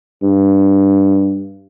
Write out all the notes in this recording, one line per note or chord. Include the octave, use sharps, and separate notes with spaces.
G2